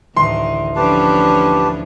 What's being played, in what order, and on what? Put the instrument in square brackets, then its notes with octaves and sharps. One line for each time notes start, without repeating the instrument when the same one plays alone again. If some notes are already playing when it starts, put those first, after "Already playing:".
[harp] A1 D2 [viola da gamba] D#3 [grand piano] C6
[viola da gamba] F3 C#4 D4 [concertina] G4 B4 A5